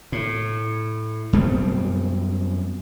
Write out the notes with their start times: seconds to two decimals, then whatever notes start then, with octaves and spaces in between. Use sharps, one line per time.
0.12 A2
1.33 F#2 B2 G3 C4